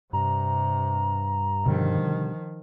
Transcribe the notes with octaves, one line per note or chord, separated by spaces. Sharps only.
G2 C3 A#5
B2 D3 D#3 F3 G3